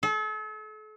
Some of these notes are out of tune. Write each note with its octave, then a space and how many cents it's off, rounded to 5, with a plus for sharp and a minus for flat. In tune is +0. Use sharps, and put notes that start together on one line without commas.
A4 -40